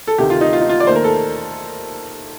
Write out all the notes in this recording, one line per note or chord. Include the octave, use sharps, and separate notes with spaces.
A4
D2 C3 D#3 A3 G4
F4
D#4
F4
D#4
F4
D5
D#2 D#3 A3 C5
A#4
A4